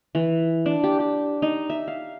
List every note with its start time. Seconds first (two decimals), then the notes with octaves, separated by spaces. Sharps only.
0.15 E3
0.66 D4
0.84 G4
1.00 G4
1.42 D#4
1.70 E5
1.88 F5